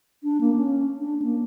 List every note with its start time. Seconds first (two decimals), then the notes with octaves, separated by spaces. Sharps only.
0.24 D4
0.41 A#3
0.56 C#4
0.99 D4
1.22 A#3